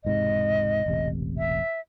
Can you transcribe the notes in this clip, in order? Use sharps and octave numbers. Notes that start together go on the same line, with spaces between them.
E1 G#2 C3 D#5
E1 A1 C3
E5